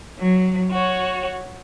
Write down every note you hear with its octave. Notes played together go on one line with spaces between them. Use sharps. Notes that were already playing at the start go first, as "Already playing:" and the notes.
F#3
F#4 C#5